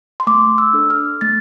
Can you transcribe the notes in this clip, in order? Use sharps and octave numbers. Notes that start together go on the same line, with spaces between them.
C6
A3 D6
E6
D4 A4
F6
A3 A6